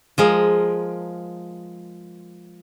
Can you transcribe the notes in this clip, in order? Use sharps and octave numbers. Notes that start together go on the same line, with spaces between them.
F3 G#3 A#4